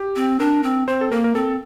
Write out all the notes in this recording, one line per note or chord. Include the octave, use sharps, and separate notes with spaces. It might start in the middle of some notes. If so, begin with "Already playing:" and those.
Already playing: G4
C4
D4 A#4
C4
C4 C5
A4
A#3 A#4
A#4
C4 A4